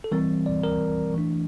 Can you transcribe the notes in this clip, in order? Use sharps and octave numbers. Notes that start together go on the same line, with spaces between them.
A4
E3 G3 C4 A#4
D5
A#4
E3 A3 D4